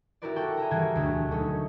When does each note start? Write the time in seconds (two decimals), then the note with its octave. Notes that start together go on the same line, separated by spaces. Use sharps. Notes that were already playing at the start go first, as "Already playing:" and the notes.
0.22 E4 F#4 G4 A#4 B4 D5
0.36 A4 F#5 G5 C#6
0.57 G#4 E5 A#5
0.71 E3 G3 F#4 G#4 G5 G#6
0.96 E1 D2 A3 G4
1.31 F#3 A3 C#4 D#4